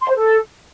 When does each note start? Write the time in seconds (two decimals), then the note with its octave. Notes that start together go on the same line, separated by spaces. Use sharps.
0.01 C6
0.08 C5
0.16 A4